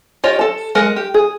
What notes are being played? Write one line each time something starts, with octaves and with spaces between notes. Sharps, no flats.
F4 G4 C#5 D#5
A4 A5
G#3 A#4 F#5
G4
G#4